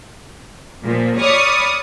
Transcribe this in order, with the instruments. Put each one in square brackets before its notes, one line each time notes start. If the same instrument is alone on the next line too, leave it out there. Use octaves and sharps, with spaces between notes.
[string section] A#2 F3
C#5 D5 B5 C#6 D#6 F6